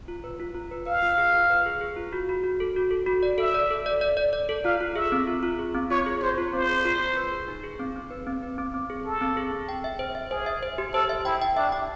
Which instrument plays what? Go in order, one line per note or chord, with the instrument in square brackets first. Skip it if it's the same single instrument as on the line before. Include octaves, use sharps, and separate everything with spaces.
[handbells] F4
B4
F4
F4
B4
[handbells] B4 [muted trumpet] F5
[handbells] F4
G#4
F4
B4
G#4
G#4
F4
F#4
F#4
F#4
A4
F#4
A4
F#4
D5
[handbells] A4 [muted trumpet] E5
[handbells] D5
A4
D5
D5
D5
D5
A4
[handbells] F4 [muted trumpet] F5
[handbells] F4
[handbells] G#4 [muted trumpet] E5
[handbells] C4
F4
F4
G#4
C4
[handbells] F4 [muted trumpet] C#5
[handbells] G#4
[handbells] F4 [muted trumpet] C5
[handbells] F4
[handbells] C4 [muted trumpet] C5
[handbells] G#4
F4
F4
B4
G#4
D#4
G#4
C4
C4
B4
C4
B4
C4
C4
G#4
[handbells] G#4 [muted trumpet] A4
[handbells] C4
G#4
C4
G5
E5
C5
E5
[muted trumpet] G#4 [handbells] C5
[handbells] E5
C5
G4
[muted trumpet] A4 [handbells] C5
[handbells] E5
[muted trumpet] E4 [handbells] G5
[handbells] G5
[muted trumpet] D4 [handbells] E5
[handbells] G5